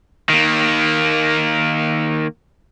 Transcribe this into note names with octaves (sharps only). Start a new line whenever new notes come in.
D#3 A#3